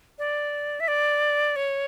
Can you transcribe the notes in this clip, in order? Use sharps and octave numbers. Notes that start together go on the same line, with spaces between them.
D5
E5
D5
C#5